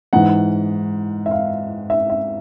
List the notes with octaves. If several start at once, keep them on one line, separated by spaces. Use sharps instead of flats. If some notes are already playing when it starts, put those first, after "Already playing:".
G#2 E3 F#5
E5
F5
E5
E5